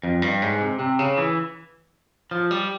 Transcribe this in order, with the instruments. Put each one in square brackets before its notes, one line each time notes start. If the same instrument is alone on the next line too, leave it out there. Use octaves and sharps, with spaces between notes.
[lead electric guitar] F2
G2
G#2
C3
C3
C#3
E3
F3
G3